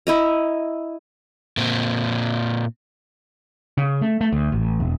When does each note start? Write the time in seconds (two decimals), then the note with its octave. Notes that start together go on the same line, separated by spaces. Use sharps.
0.07 E4 D#5 A#5
1.57 A#2 C4
3.77 C#3
4.01 A3
4.21 A3
4.32 D2
4.52 A1
4.80 E1